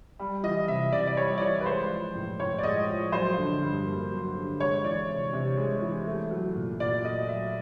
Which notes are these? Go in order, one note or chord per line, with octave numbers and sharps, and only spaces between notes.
G3
E3 D#5
C3 E5
C3 D5
D5
G3 C#5
D5
E3 C#5
B4
G#3 C5
F3
A2
A2 C#5
D5
G#3 D#5
F3
F#3 C5
D3
G2
A#3
F#3
D3
G#3 C#5
E3 D5
C3
C3
G#3
E3
A3
F#3
A#2
A#2 D5
A3 D#5
F#3 E5